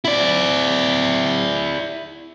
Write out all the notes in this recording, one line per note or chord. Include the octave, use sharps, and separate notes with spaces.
E4 D5